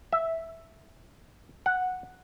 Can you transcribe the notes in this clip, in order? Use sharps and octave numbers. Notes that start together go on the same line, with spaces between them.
E5
F#5